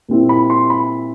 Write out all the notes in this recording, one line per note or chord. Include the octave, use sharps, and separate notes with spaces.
A#2 G3 C4 E4
B5
C6
B5